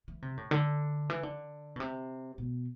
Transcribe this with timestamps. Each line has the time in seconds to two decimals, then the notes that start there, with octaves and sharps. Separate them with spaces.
0.08 E3
0.22 C3
0.37 A2
0.51 D3
1.10 E3
1.23 D3
1.76 B2
1.80 C3
2.38 B2